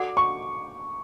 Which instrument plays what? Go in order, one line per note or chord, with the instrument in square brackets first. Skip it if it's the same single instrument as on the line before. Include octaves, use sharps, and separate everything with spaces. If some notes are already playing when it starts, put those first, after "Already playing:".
Already playing: [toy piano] F#4 A4 D5 F#5 [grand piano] D6
[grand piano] C#6